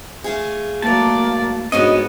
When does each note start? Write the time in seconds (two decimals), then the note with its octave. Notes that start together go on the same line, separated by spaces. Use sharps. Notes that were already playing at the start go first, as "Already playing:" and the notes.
0.24 A3 F4 G#4
0.82 G#2 F#3 A3 A#3 D5 A5
1.72 G#2 B3 C#4 D4 F#4 D#5